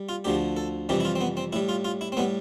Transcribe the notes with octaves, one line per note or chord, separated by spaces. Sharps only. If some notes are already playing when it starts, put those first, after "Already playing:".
Already playing: G3
F4
D2 D3 F3 G4
A4
F2 C3 E3 G3 G4
E4
F4
C4
B3
C4
A2 G3 E4
F4
F4
E4
C4
A2 G3 B3